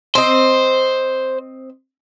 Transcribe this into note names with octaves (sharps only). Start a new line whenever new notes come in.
C4 C5 D#5